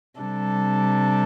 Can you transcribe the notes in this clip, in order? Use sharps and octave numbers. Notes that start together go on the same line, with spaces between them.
C3 G3 D4 A4